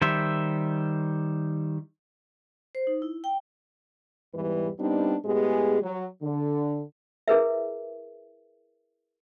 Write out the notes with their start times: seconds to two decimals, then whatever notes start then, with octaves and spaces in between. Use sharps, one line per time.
0.02 D#3 G3 C5 E5
2.75 C5
2.87 D#4
3.02 E4
3.24 G5
4.34 E2 G#2 E3 G3 B4
4.80 G3 B3 C4 D4 D#4
5.25 A2 G#3 B3 G4 G#4
5.82 F#3
6.22 D3
7.28 E4 G#4 A#4 B4 E5